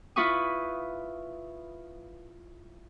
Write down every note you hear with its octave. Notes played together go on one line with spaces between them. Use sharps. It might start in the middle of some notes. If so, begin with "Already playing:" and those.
E4 F4 B4 B5 C#6 D#6